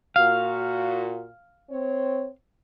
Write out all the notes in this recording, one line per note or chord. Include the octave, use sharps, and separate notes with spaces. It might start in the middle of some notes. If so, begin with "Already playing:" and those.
A#2 F#4 F5
C4 C#5